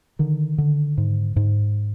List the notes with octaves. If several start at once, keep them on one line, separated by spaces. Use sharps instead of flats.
D3 D#3
D3
G#2
G#2